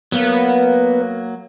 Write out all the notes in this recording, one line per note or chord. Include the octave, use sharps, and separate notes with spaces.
F#3 A#3 B3